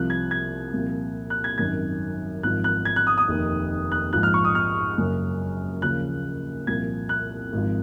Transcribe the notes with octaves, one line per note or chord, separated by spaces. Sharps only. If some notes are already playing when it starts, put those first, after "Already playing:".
Already playing: C2 C3 F3 F#6
G#6
G#6
C2 A#2 F3
F#6
G#6
G#1 F#2 D#3 G#6
G#1 G#2 F3 F#6
F#6
G#6
F#6
D#6
D#6
F1 D#2 D#3
F#6
A#1 G#2 F3 F#6
F6
C#6
D#6
F6
F#1 F#2 C#3
D#2 C#3 F3 F#6
C2 A#2 F3 G#6
F#6
G#1 G#2 F3